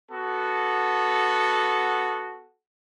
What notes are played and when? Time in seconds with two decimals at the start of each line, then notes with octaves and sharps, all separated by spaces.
0.11 B3 F#4 A4